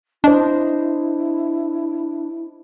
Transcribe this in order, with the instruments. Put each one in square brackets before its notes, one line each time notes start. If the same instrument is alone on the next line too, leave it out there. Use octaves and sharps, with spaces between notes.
[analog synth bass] D4 [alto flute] E4 [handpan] C5 D#5